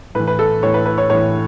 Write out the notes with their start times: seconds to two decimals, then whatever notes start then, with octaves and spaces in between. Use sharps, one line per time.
0.15 A2 B4
0.20 E3
0.27 B4
0.39 A4
0.63 A2 E3 C#5
0.74 B4
0.86 B4
0.98 C#5
1.10 A2 E3 C#5